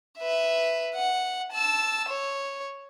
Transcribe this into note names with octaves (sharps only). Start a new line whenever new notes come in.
B4 E5
F#5
A5 E6
C#5